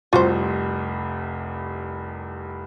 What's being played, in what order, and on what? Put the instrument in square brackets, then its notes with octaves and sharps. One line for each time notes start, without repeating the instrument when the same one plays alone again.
[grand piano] F1 C2 [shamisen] F4 F#4 C5